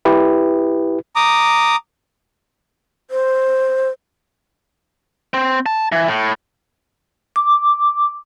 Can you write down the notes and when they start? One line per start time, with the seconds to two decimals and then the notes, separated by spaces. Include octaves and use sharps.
0.05 E4 G4 B4
1.16 A#5 D6 D#6
3.11 C5
5.34 C4
5.66 A5
5.92 E3
6.08 A2
7.36 D6